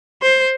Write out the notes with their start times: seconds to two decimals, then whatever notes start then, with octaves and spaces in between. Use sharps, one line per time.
0.22 C5